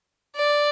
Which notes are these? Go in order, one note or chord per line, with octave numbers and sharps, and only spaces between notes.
D5